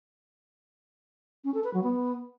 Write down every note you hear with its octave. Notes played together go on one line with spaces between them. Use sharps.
C#4
A4
B4
F#3
B3